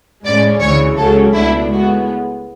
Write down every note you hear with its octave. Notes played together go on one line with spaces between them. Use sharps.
A2 G#3 C#4 D5
D2 C#3 E3 C#5
C#2 C#3 F#3 C#4 A4
C#2 B2 A3 D4 E4
A2 G#3 B3 F#4